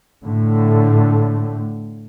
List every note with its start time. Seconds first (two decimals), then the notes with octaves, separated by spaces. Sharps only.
0.24 A2 D3 A3